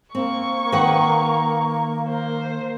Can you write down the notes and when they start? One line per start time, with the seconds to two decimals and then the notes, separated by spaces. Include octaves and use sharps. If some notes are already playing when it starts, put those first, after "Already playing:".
0.15 A#3 C4 C#6
0.72 D#3 B4 F#5 A#5
2.08 A#4 C5